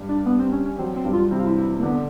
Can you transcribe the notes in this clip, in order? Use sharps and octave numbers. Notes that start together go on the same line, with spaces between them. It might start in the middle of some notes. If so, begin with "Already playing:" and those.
Already playing: G2 G3
D4
B3
C4
C#4
C#4
F#3 C4
C4
G2 G3
F4
C3 C4 E4
F4
E4
A#3
D3 B3 D4